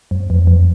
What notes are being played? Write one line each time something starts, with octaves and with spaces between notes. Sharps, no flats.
F#2
F2
F2